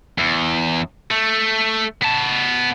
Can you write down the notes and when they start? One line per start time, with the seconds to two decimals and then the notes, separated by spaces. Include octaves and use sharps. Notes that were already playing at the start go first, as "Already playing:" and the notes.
0.18 E2
1.11 A3
2.02 B3 A5